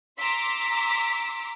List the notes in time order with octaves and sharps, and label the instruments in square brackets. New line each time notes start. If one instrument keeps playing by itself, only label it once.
[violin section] A#5 C6 D6 E6 B6